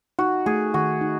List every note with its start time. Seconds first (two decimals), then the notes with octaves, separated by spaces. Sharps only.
0.19 D#4 F#4
0.46 A3 G#4
0.74 D#3 F#4
1.01 D#4